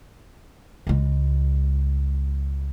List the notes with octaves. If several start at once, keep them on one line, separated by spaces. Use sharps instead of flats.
C#2 G#3